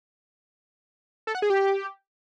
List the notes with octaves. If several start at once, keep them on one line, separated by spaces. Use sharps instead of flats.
A4
F#5
G#4
G4